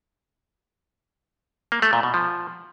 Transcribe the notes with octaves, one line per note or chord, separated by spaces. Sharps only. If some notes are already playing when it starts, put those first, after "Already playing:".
A#3
A3
A#2
B2
F3